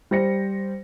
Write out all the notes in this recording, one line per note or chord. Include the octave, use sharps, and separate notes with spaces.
G3 C5 A#6 C#7